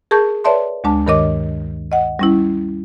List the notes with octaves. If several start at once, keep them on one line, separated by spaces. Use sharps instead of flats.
G#4 A#4 A5 C#6 G6
B4 C#5 D5 E5 A5 C6
D2 G#3 D4 A5
G2 D#3 A#4 C#5 D#5 D6
D#5 F#5
G3 C#4 E4